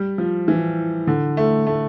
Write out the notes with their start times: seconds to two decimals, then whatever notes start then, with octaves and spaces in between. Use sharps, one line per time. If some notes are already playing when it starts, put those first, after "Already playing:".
Already playing: G3
0.18 F3
0.48 E3
1.07 D3
1.37 A3
1.67 A3